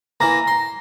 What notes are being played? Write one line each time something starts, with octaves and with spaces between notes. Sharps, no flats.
E3 A#3 A#5 A#6
C6